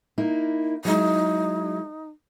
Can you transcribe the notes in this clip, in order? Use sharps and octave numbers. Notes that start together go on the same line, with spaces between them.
A#3 D#4 E4
F#3 G#3 D#4 E4